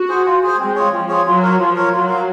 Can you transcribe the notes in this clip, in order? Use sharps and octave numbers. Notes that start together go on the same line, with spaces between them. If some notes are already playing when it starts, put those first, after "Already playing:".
Already playing: F#4
G#4 C5
F4
G#4 C5
G#3 C4
F4 G#4 C#5
F3 C4
F4 G#4 C#5
F#3 F4
A#4 C#5
F3 F4
A#4 C#5
F#3 F4
A#4 F5